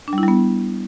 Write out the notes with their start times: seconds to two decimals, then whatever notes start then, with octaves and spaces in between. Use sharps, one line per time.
0.08 D4
0.13 G3
0.18 E4
0.23 G3
0.28 B3